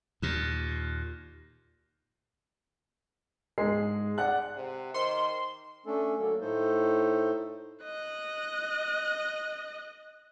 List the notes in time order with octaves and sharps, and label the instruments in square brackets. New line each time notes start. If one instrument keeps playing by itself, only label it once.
[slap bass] D#2 A#2
[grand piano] G#2 G#4 C7 [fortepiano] G#3
[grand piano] D5 F#5 F#6
[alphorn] C3
[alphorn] D#3 [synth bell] C5 D#5 [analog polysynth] C6
[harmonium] A3 C#4 D4 A4
D3 F#3 A#3 A4
A2 A3 D#4 A4 C5
[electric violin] D#5 F#6